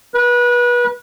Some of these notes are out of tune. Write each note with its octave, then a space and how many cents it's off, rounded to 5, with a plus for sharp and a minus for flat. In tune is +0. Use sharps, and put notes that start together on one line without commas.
B4 -30